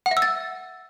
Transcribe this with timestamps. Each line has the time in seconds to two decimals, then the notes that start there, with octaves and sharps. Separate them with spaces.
0.06 F#5
0.11 E5
0.17 E6
0.22 A6